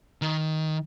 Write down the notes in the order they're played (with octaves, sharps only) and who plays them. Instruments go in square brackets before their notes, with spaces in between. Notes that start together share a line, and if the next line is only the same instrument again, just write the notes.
[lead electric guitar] D#3